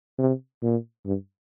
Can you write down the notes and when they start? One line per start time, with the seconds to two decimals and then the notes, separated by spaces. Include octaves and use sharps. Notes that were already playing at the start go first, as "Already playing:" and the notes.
0.19 C3
0.63 A#2
1.06 G2